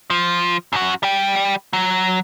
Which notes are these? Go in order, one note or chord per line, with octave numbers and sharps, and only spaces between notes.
F3
F#2 F#4
G3 G5
F#3